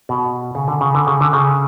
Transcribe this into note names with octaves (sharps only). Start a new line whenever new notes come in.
B2
C#3
D3
C#3
D3
C#3
D3
C#3